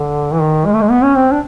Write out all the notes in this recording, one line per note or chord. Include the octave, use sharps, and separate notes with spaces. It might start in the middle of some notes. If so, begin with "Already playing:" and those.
Already playing: D3
E3
D#3
G#3
A3
G#3
B3
C#4
C4
D4